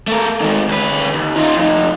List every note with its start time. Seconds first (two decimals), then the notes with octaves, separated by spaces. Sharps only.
0.07 A3 A#4
0.41 D#3 G#3
0.68 D2 B4
1.14 D#2
1.36 D#4 F4
1.57 F2 D#4